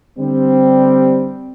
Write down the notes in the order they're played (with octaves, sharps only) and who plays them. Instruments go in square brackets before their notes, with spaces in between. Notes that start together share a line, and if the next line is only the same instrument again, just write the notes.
[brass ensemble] D3 G3 C4